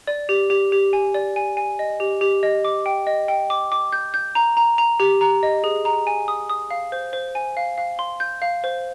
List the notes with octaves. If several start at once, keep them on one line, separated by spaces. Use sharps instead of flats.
D5
G4
G4
G4
G#5
D5
G#5
G#5
D#5
G4
G4
D#5
D6
G5
D#5
G5
D6
D6
G6
G6
A#5
A#5
A#5
G4
A#5
D#5
G#4
A#5
G#5
D#6
D#6
F5
C5
C5
G#5
F5
F5
C6
G6
F5
C5